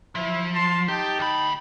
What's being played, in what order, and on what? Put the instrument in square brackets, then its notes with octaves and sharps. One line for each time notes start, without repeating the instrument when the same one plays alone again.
[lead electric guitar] F3 [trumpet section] E4
[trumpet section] A5 C6
[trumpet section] D#4 G5 A5 [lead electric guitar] G4
[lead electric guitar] D2 B5